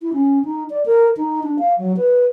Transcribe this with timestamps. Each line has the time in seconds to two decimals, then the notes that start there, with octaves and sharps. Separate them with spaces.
0.02 E4
0.13 C#4
0.45 D#4
0.70 D5
0.86 A#4
1.17 D#4
1.44 D4
1.59 F5
1.78 F#3
1.97 B4